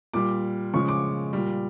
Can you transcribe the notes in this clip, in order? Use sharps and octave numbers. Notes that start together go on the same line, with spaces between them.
A#2 G3 D6
C#3 F3 G#3 C#6
D6
A#2 G3